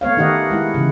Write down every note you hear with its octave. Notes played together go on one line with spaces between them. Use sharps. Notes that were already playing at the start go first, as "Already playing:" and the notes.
A3 B3 C#5 F5
D#3 D#4 G4 D#5 F#5
G#3 E4 F#5
C#3 E3